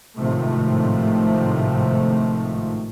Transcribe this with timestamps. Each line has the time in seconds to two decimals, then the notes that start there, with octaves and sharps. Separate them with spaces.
0.16 G#1 A2 C3 D#3 F3 A3